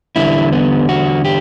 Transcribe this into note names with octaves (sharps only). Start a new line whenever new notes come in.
E2 D3 G3 E4
B3
F#4
G4